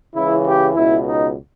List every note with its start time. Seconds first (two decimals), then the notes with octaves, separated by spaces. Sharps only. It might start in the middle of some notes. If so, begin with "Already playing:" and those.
0.14 C#2 C#3 E3 E4
0.45 G4
0.74 C#2 B2 E4
1.06 D#4